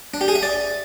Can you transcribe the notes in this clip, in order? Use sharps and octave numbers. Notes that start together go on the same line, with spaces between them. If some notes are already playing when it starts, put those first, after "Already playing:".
D4
G4
G#4
E5
D5